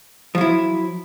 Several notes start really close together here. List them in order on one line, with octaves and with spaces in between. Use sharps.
F3 F#3 E4